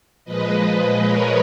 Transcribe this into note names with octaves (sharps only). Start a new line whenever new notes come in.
A#2 F3 G#3 B4 D#5
A#4 C#5